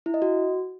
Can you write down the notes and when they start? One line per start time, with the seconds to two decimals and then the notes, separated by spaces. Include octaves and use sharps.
0.06 E4
0.14 D#5
0.22 F#4